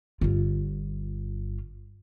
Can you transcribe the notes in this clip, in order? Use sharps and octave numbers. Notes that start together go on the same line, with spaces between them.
G1 F4